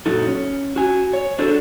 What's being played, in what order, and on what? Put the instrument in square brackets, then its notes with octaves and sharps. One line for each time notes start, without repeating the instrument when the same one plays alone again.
[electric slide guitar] F#2 A#2 D#4 F#4 A4
C#4
F#4 G#5
C#5
D4 F#4 G#4 A4 C5